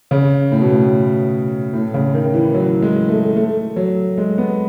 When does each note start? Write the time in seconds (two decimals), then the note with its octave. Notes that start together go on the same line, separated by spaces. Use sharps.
0.11 C#3
0.52 A2
0.61 B2
0.72 A2
1.73 A2
1.94 C#3
2.14 D#3
2.34 E3
2.54 F#3
2.82 G#3
3.09 A3
3.36 A3
3.76 F#3
4.18 G#3
4.38 B3